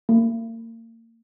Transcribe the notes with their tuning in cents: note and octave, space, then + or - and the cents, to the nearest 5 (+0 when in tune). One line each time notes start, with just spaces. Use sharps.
A#3 -35